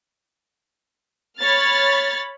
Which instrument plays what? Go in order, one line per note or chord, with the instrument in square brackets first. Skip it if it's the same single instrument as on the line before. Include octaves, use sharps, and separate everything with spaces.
[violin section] C#5 B5 F6 A6